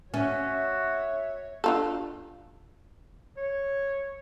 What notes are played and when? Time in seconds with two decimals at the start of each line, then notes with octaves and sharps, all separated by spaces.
0.14 C#4 F#4 C#5 E5
1.64 D4 F4 A4
3.37 C#5